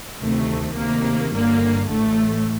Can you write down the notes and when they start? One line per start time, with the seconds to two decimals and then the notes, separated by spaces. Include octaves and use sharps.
0.21 D2 C3 D#3 A3
0.76 D2 C3 D#3 A#3
1.33 G1 G2 D3 A#3
1.88 A1 A2 A3